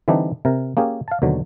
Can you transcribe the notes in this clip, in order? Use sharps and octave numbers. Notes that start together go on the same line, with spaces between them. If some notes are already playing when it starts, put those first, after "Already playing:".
D3 E3 G3 C4 D4 D#4
C3 A#4
A#3 C#4 G4 G#4
F5 A5
D#2 B2 D3 F#3